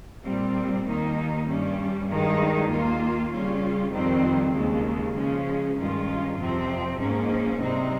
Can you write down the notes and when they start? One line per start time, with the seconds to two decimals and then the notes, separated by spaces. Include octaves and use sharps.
0.24 A#2 G3 C4
0.86 D#2 D#3 A#3 D#4
1.46 G2 G3 C#4
2.08 G2 D#3 G#3 D#4
2.69 D#2 D#3 A#3 F4
3.31 C#3 G3 C#4 F4
3.92 F2 D#3 G3 C4
4.53 D#2 C#3 G#3
5.15 C#3 F3 G#3 C#4
5.77 G2 D#3 G#3 C#4 F4
6.38 F2 C3 F3 C4
6.98 G#2 F3 A#3 C#4
7.61 C3 G3 C4 D#4